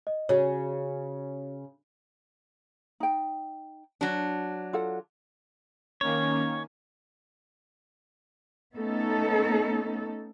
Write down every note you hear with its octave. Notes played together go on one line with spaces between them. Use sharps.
D#5
C#3 F#4 C#5
D#4 G5
F#3 D4 F#4
F4 A4 F#5
D#3 A#3 C#4 C#5
A3 B3 C#4 D#4 A4